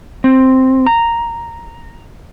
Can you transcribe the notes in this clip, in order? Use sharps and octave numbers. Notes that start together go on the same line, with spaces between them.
C4
A#5